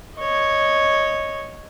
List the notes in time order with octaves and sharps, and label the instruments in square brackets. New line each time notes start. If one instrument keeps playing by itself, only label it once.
[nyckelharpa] C#5 D#5